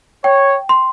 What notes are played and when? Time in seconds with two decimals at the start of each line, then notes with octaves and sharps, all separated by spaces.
0.24 C#5 G5
0.69 C6